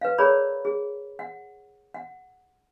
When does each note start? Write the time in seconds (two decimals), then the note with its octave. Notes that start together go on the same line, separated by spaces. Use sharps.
0.01 B4 F5
0.18 G#4 A#4 C#5 D5 A#5 B5
0.65 G#4
1.19 F#5
1.94 F#5